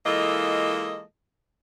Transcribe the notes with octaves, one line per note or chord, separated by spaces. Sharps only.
E3 G#3 A#3 F4 A4 D#5